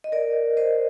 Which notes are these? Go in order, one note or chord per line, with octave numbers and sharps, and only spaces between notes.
D#5
A#4 D5
C5 D#5